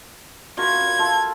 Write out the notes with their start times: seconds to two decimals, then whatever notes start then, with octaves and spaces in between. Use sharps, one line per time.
0.58 F4 F#4 A#4 B5 G#6
0.99 F4 A4 A5